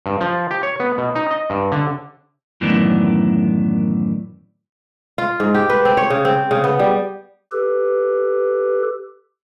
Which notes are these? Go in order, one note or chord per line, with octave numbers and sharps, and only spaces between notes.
G2
F3
G4
C#5
B3
B2
D#4
D#5
G2
D3
F#2 A2 D#3 E3 B3 D4
F4
G#2
G4
B4
C4
C#5
C#3
C4
C#3
B3
G3
G4 A4 B4